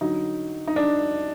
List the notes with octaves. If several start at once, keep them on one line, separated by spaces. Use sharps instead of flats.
D3 F#3 D#4
D#4
D4